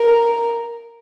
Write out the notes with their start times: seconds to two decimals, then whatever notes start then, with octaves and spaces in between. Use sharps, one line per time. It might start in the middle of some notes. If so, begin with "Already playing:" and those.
Already playing: A#4